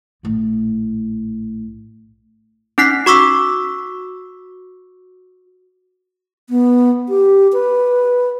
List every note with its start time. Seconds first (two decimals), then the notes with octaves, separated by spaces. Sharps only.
0.23 A#1 A2
2.78 C#4 D#4 F#6 B6 C7
3.06 F#4 C#6 D6 E6 B6
6.50 B3
7.09 G4
7.53 B4